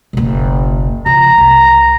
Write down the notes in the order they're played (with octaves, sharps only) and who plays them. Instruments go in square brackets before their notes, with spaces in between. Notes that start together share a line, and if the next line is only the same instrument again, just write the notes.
[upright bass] F#1 B1
[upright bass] C#3 F3 [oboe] A#5
[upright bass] C2